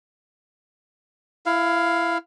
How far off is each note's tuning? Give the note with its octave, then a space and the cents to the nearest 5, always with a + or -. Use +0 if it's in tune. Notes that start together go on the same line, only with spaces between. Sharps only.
E4 +20 F5 +0